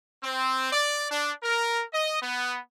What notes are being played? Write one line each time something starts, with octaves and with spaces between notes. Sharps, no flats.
C4
D5
D4
A#4
D#5
B3